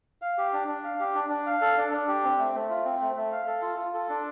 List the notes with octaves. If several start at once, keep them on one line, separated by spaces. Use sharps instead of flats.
F5
G4
D4
D4
F5
G4
D4
D4
F5
A4
D4
D4
G4
C4
A3
A3
F4
C4
A3
A3
F5
A4
F4
F4
A4
D4